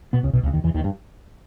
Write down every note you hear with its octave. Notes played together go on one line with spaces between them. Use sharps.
B2 B3
C#2 C#3
B1 B2
C#2 C#3
D#2 D#3
E2 E3
D#2 D#3
G2